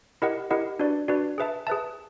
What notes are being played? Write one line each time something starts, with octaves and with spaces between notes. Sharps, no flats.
E4 G4 A#4 D#5 F#5
E4 G4 A#4 D#5 F#5
D4 F#4 B4 D5
D4 F#4 B4 D5
G#4 B4 E5 A5
G#4 B4 E5 A5